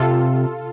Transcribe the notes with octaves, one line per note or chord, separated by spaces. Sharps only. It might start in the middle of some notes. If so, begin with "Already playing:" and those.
Already playing: C3 F4 A4